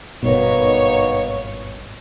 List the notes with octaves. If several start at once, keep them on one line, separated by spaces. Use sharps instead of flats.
G#1 G2 B2 A#3 B3 D#4 C#5